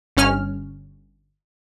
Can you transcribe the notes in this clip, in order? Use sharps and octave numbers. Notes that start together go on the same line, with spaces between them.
G1 C#4 F6